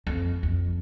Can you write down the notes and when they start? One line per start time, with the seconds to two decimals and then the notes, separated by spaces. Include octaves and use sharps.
0.07 F2
0.43 F2